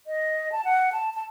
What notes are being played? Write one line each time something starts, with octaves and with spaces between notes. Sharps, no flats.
D#5
A5
F#5
A5
A5